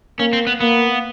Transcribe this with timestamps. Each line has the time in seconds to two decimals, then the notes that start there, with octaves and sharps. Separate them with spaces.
0.19 A#3 C#4
0.33 C4
0.47 B3
0.60 A#3 B3